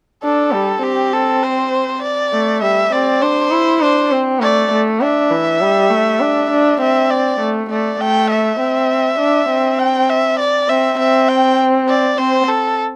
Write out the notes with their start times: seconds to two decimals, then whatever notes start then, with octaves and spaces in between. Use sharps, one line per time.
0.24 D4 A4
0.52 G3
0.83 C4 G4
1.13 A4
1.43 C5
2.02 D5
2.33 A3
2.62 G3 E5
2.92 C4 D5
3.21 D4 C5
3.51 E4
3.81 D4 C5
4.11 C4
4.41 A3 D5
4.72 A3
5.01 D4 E5
5.31 E3
5.61 G3
5.90 A3
6.21 D4
6.50 D4
6.81 C4 E5
7.10 D5
7.40 A3
7.70 A3 D5
8.00 A3 G5
8.30 E5
8.60 C4
9.19 D4
9.50 C4
9.79 G5
10.09 E5
10.39 D5
10.69 C4 E5
10.99 C4 E5
11.29 G5
11.89 D5
12.18 C4 C5
12.48 A4